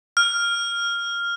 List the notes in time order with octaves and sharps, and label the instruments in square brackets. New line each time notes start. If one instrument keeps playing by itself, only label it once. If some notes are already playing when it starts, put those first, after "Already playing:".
[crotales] F6